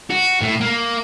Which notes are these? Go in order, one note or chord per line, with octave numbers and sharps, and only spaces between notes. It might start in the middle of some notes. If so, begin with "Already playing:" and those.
F#4
A2
A#3